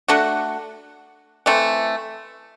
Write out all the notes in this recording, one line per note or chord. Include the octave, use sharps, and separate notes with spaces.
A3 D4 F#4
E3 A3 C4